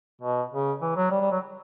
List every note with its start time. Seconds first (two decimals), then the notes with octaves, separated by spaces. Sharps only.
0.22 B2
0.52 C#3
0.82 E3
0.96 F#3
1.11 G3
1.21 G3
1.32 F#3